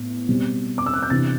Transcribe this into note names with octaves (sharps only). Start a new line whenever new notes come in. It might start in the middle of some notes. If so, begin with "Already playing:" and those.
Already playing: A2 B3
B2 G3 C4
D6
E6
F#6
G6
C3 E3 B3 D4 A6